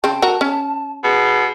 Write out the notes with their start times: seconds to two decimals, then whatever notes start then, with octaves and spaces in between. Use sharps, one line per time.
0.04 C#3 C4 A5
0.22 F#4 A#4
0.41 C#4
1.04 B2 G#4